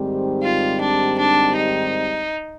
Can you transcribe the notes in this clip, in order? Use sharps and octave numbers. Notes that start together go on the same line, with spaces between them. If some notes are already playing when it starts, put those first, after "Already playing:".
Already playing: G#2 D#3 G3 C4 G4
F4
D4
D4
D#4